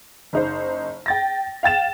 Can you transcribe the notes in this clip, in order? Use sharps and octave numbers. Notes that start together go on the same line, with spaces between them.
F#1 D#4 C5
G5 A6 A#6
F5 G5 A6 E7